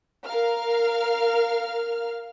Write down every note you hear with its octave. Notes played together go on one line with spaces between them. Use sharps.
A#4 F5 F6